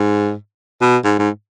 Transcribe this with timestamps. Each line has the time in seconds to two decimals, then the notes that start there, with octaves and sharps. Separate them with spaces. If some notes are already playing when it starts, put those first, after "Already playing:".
Already playing: G#2
0.81 B2
1.04 G#2
1.19 G#2